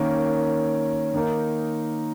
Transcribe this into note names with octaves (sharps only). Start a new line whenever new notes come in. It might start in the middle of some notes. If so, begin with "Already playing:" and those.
Already playing: D#3 A#3 C#4
D#3 A#3 D#4